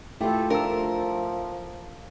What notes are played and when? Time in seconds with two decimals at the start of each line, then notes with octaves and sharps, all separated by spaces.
0.21 A3 E4 F4 G4 A4
0.50 F3 D4 A#4 E5 E6